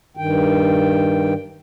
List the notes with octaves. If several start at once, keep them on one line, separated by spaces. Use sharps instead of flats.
G2 D#3 G5